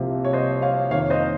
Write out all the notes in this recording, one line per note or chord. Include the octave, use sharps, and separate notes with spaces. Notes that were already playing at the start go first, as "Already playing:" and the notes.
Already playing: C2 C3 F3 A#3
C#5
C5 D#5
C#5 F5
F2 D#3 A#3 C#5 F5
C5 D#5